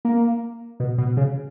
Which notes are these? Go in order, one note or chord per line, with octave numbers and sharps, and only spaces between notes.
A#3
B2
B2
C#3